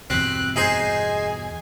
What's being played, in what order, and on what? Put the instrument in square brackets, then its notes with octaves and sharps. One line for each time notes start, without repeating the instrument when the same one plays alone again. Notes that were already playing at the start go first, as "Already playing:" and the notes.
[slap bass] E2 G2 B2 [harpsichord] C4 [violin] F#6
[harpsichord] D#4 G#4 C5 [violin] G#5